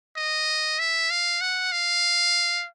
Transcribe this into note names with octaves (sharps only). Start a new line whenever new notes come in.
D#5
E5
F5
F#5
F5